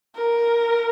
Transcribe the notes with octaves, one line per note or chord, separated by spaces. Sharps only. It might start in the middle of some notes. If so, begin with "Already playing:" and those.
A#4